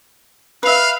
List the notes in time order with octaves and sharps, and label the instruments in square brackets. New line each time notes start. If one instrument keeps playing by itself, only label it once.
[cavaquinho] B4 E5 [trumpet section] F5